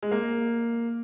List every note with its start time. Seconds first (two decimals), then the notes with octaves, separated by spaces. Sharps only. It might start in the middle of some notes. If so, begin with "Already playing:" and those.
0.03 G#3
0.11 A#3